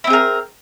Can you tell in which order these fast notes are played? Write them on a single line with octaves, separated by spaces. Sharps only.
E4 C4 G#4 A#4